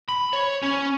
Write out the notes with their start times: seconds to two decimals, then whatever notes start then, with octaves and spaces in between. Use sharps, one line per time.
0.09 B5
0.33 C#5
0.63 C#4